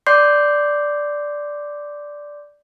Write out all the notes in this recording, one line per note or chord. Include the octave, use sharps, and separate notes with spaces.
D5 C6 D6 G6 C7